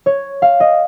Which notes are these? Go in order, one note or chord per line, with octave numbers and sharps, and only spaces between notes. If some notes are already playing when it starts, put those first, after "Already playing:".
C#5
F5
D#5